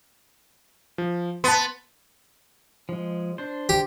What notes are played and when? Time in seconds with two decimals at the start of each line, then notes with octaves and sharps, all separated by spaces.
0.98 F3
1.44 B3 A5 C6
2.89 F3 G#3
3.38 D4 C5
3.69 G4